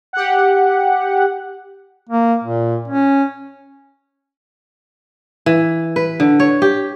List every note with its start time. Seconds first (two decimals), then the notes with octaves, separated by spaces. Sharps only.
0.13 G4 F#5
2.09 A#3
2.44 A#2
2.88 C#4
5.46 E3
5.96 B4
6.20 D3
6.40 C#5
6.62 G4